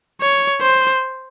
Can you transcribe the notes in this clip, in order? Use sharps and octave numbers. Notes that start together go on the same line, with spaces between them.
C#5
C5